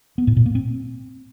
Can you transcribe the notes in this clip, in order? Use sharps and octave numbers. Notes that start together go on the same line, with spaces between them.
B3
A2
A#2
A#3
C4